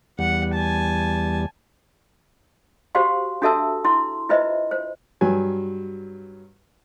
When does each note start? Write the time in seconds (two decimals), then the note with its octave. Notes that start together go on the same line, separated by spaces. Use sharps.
0.19 E2 G3 F#5
0.54 G#5 A5
2.95 F#4 G4 C5 F5 C6
3.42 D4 F#4 A4 E5 A5 E6
3.84 E4 C6
4.29 E4 F4 B4 C5 D#5 E5
4.71 C5
5.21 G2 F#3 G#5